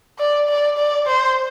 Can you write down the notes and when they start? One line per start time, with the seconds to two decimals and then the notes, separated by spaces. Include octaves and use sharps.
0.19 D5
0.48 D5
0.78 D5
1.07 C5